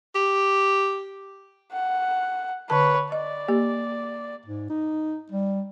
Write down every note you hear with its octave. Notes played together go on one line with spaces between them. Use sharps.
G4
F#5
D3 B4 C#5 A5
D5 D#5
A#3 G4
G#2
D#4
G3